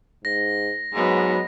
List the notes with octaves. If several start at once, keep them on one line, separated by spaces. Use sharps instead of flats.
G#2 A#6
G#2 F#3 B3 D#4